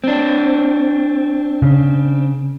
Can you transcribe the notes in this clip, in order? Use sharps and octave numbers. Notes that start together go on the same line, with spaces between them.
C4 D4
C#3